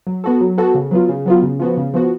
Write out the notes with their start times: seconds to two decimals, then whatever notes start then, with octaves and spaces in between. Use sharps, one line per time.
0.07 F#3
0.24 B3 F#4 A4
0.41 F#3
0.58 B3 F#4 A4
0.75 C#3
0.91 F#3 B3 F4
1.09 C#3
1.26 F#3 B3 F4
1.43 C#3
1.59 F3 B3 F#4
1.77 C#3
1.94 F3 B3 F#4